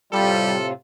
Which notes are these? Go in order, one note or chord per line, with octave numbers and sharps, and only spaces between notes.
A2 C3 G3 F4 A4